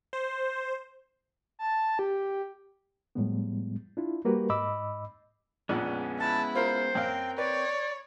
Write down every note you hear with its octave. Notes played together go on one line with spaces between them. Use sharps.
C5
A5
G4
A2 F3 G3 G#3 B3
D4 E4 F4
G3 A#3 F#4 G4 A#4 B4
G#2 D#5 B5 D6 E6
A#1 F2 G#3 B3 C#4 D4
E4 A5
F4 A#4 C5
F#2 C4 A#4 F5 G5
B4 C#5 D5